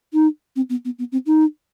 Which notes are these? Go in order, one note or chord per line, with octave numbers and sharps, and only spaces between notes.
D#4
C4
B3
B3
B3
C4
D#4